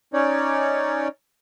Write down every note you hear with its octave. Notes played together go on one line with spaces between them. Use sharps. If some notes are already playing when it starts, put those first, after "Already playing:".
C#4 D#4 C#5 D5